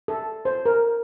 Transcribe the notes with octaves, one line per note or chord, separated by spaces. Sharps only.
A4
C5
A#4